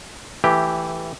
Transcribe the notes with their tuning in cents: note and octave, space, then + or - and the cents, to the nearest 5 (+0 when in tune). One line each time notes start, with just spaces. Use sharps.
E3 +0 A3 +15 G4 +0